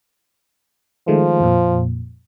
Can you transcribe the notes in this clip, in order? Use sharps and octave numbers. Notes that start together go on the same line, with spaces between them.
D#3 F3 G#3 A3
F2 A#2